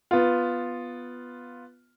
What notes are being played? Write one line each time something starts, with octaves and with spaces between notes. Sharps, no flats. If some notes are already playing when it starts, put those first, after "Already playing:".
B3 F4